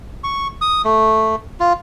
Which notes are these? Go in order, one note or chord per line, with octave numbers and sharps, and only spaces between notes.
C#6
D#6
A3
F4